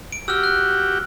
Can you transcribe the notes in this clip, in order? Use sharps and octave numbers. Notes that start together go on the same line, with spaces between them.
D7
F#4 G4 E6 F6
F#6